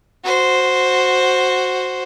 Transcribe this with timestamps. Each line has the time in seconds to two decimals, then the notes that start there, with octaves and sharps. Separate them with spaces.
0.24 F#4 C5